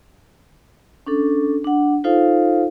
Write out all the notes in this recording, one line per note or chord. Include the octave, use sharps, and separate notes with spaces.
C#4 D4 A4
D4 F#5
D#4 F4 A4 C5 F5